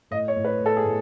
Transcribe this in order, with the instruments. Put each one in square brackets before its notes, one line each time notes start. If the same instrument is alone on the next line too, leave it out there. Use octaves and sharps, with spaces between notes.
[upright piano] A2 D#5
C#5
A2
B4
A2 A4
G#4
A2